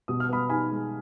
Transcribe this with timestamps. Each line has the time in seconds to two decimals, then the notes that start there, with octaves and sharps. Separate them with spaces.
0.08 B2 D#6
0.20 F6
0.29 B3 B5 D#6
0.49 D#4 G#5 B5
0.70 G#3